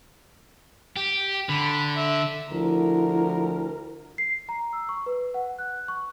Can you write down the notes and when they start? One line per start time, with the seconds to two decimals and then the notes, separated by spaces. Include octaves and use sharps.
0.97 G4
1.49 D3 B5
1.96 E5
2.51 D2 F3 E4 A#4
4.18 C7
4.49 A#5
4.73 E6
4.89 C#6
5.06 B4
5.34 F#5
5.59 F#6
5.88 C#6